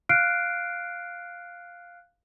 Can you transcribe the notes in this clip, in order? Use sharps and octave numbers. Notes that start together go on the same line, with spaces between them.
F5 F6 F#6 C7 D7